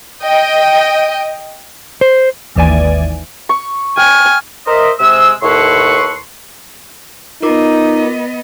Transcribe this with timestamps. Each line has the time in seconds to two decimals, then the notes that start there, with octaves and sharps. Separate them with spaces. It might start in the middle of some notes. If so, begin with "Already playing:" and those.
0.21 D#5 G5
2.01 C5
2.56 G#1 D#2 E3 D5 G#5
3.49 C#6
3.97 G5 G#5 F6
4.67 A#4 C5 D#5 E5
4.99 C3 G#3 E6
5.42 D#2 A2 A4 B4 C6 C#6
7.42 B3 D#4 F4 A#4 D#5 D6